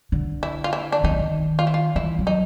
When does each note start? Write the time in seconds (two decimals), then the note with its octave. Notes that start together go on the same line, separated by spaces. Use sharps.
0.12 D3
0.43 E4
0.64 F4
0.73 E4
0.92 D4
1.04 D#3 D#4
1.11 E3
1.19 D#3
1.59 F4
1.67 E4
1.74 F4
1.96 E3 E4
2.19 F#3
2.27 D#4